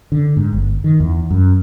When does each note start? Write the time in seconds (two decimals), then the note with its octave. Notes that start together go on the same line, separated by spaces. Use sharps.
0.12 D3
0.37 G#2
0.53 G1
0.84 D#3
1.00 E2
1.31 F#2